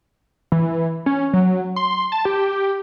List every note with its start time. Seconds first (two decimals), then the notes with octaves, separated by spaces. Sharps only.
0.52 E3
1.06 C#4
1.33 F#3
1.76 C6
2.12 A5
2.25 G4